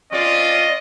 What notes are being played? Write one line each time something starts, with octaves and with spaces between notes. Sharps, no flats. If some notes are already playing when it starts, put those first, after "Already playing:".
C4 C#4 F4 D5 D#5